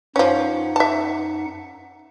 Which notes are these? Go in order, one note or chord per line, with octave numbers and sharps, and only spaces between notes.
F#2 F3 C#4 D#4 F#5
E5 A5